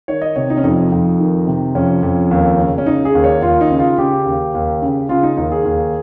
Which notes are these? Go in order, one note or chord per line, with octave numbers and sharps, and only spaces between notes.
D#3 C#5
D#5
C3 C#5
D#4
C#4
F2 D#4
F2
D#3
C3
F2 C#4
F2
D#2
C#3
C#4
C#3 D#4
G#4
D#2
C#5
D#2 F4
D#4
C#3
F4
C#3 G4
D#2
D#2
C#3
C#3 F4
D#4
D#2 D#4
G#4
D#2